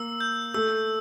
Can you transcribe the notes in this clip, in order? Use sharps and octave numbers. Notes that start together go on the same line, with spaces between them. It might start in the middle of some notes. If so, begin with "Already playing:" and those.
Already playing: A#3 E6
G6
A3 E6